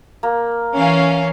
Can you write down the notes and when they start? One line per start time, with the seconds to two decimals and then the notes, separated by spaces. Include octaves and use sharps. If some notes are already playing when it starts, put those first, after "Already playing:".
0.23 A#3
0.76 E3 C#4 F5